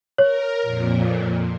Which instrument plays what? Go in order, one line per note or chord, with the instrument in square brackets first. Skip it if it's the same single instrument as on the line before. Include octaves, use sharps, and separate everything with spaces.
[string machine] A#4 [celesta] C#5
[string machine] F2 A#2